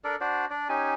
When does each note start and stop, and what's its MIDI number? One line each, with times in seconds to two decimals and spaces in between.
0.04 0.16 62
0.04 0.16 69
0.04 0.16 70
0.04 0.16 74
0.21 0.46 62
0.21 0.46 66
0.21 0.46 72
0.21 0.46 74
0.50 0.68 62
0.50 0.68 74
0.69 0.94 61
0.69 0.94 63
0.69 0.94 67
0.69 0.94 80